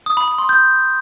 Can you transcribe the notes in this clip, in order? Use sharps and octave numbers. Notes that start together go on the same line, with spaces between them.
D#6
B5
B5
C6
G6